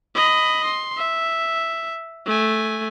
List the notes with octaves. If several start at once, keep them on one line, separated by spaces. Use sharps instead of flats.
D#5 B5
C6
E5
A3 G#5